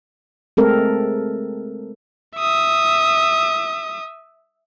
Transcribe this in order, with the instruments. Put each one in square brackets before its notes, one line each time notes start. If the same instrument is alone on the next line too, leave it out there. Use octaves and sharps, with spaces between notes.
[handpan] G#3 A3 C4 A4 A#4
[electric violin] E5 D#6